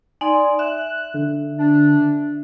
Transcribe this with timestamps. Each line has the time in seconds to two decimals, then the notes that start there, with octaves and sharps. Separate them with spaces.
0.21 D#4 D5 G#5 C6
0.59 E5 F#6
1.14 D3
1.58 D4